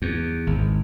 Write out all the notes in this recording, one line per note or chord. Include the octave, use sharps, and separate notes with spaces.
E2
G#1